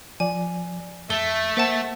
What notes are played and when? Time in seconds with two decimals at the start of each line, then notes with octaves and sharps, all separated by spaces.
0.20 F3 D5 G#5
1.10 F2 A3 E5 G7
1.57 A#3 C5 F#5 A5